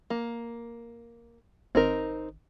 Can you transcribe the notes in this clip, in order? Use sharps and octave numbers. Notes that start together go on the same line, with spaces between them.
A#3
G#1 C4 D#4 A#4